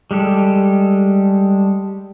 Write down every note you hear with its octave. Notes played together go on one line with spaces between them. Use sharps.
G3 G#3 G4 A4